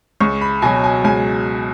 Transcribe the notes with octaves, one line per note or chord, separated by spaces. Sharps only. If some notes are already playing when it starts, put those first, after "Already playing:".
C#2 C#6
B5
B2 F#3 G#5
G#5
C#2 G#5